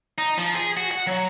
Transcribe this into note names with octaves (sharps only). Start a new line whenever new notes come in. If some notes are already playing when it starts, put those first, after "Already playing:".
D#4
F3
G#4
F#4
F#5
F#3